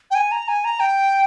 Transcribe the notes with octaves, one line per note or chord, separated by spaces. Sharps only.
G5
G#5
A#5
G#5
A#5
G5